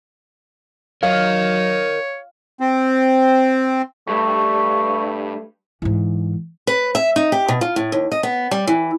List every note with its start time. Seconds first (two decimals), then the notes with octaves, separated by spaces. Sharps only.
1.03 F#3 A#4 C#5 D#5 F5
2.60 C4
4.08 G2 A3 C#6
5.82 G#2 E3
6.67 B4
6.95 E5
7.16 D#4
7.32 G4
7.48 B2
7.61 F4
7.76 A2
7.92 D#2
8.12 D#5
8.23 B3
8.51 G3
8.67 E3